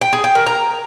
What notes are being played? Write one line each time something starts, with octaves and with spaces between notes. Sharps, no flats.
G5
G#4
G5
A#4
A#5